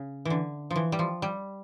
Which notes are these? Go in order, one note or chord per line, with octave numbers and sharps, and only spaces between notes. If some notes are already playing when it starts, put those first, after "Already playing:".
Already playing: C#3
D3 E3
F3
E3
G3
F3
G3